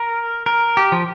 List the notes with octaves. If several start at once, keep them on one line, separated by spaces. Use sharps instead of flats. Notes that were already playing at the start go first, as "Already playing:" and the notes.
Already playing: A#4
A#4
G4
F3